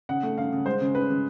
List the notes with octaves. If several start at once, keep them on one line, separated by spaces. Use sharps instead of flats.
C#3 F#5
A3
C#3 F5
C#3
G#3 C5
C#3
C#3 B4
C#3